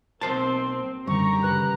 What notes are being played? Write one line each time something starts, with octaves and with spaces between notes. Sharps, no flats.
B1 A#3 C4 C5 A5 C6
F#2 D3 D#3 G3 G4 A#5 C#6
C#3 B4 F#6